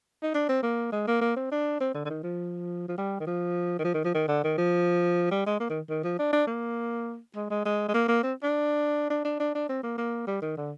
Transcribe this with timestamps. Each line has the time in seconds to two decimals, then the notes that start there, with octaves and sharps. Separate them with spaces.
0.23 D#4
0.34 D4
0.49 C4
0.63 A#3
0.92 G#3
1.07 A#3
1.22 A#3
1.36 C4
1.52 D4
1.81 C4
1.95 D3
2.05 D3
2.10 D#3
2.24 F3
2.88 F3
2.98 G3
3.20 D#3
3.27 F3
3.79 D#3
3.84 F3
3.94 D#3
4.04 F3
4.15 D#3
4.28 D3
4.44 D#3
4.58 F3
5.31 G3
5.46 G#3
5.60 A#3
5.70 D#3
5.89 D#3
6.04 F3
6.19 D4
6.33 D4
6.47 A#3
7.36 G#3
7.50 G#3
7.65 G#3
7.89 G#3
7.94 A#3
8.08 A#3
8.23 C4
8.43 D4
9.10 D4
9.25 D4
9.40 D4
9.55 D4
9.69 C4
9.83 A#3
9.98 A#3
10.27 G3
10.42 D#3
10.57 D3